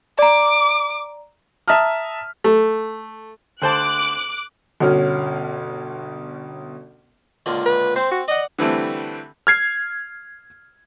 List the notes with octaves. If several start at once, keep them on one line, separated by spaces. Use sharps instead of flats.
D5 A#5 D6
E5 A5 A#5 D#6 F6
A3
D2 C5 A5 D6 F#6
G1 B2 C#4 F6
C#2 A#2 D3
B4
C4 C5
F#4
D5 D#5 F#5
D3 E3 G3 A3 C4
F6 G#6 C7